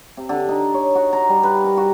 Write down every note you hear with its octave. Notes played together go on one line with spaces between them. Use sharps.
C3
D3
D#4
C#5
F#4
A#5
G3
B4
A#4
F#4